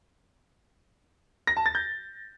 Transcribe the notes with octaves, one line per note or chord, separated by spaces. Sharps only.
A#6
A5
A6
G6